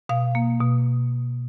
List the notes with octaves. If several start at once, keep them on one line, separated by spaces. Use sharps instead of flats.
B2 F5
A#3
B2